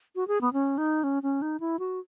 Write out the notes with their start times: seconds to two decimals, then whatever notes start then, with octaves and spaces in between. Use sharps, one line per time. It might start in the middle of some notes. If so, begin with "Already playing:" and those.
0.16 F#4
0.28 G#4
0.41 B3
0.53 C#4
0.78 D#4
1.04 C#4
1.23 C#4
1.42 D#4
1.60 E4
1.79 F#4